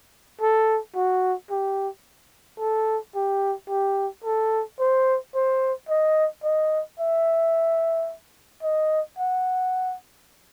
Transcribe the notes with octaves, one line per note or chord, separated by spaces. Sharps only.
A4
F#4
G4
A4
G4
G4
A4
C5
C5
D#5
D#5
E5
D#5
F#5